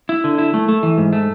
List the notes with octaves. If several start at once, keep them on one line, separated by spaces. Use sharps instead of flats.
E4
D3
E4
A3
A3
E3
G#2
A3